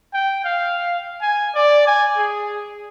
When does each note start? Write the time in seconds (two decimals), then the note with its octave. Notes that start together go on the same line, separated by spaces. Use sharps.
0.14 G5
0.44 F5
1.22 G#5
1.55 D5
1.87 G#5
2.18 G#4